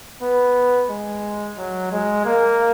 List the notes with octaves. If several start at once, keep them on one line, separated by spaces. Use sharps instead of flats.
B3
G#3
F#3
G#3
A#3